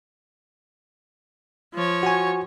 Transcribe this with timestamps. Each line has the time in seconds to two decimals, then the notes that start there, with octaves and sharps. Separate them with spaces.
1.74 F3 C#5
2.03 F#4 G#5